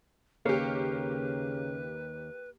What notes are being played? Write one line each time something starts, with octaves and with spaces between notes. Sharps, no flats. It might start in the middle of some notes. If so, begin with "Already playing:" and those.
D#2 C#3 A#3 G4 B4 C#5 F5